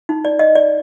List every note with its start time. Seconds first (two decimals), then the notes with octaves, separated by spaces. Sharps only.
0.09 D#4
0.25 D5
0.39 D#5
0.55 D5